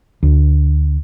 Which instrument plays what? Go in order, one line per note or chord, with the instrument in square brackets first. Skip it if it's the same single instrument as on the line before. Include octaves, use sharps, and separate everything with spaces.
[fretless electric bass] D2